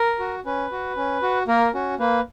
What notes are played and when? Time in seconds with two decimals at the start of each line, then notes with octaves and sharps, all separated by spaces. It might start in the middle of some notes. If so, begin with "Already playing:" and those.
Already playing: A#4
0.19 F#4
0.46 C#4 B4
0.72 F#4
0.97 C#4
1.22 F#4
1.48 A#3 A#4
1.74 C#4 F#4
1.99 A#3 B4